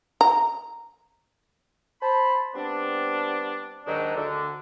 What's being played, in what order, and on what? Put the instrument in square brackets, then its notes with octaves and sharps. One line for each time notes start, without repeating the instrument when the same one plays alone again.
[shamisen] A#5
[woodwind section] C5 A5 B5
G3 B3 C4 D4
D#2 G#2 D#3 F#3 D4 D#4
D2 D3